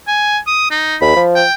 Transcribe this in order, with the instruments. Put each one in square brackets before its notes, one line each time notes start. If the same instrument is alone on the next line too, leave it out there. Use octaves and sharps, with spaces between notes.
[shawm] G#5
D#6
D#4
[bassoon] D#2 [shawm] B5
[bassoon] F3
[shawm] G5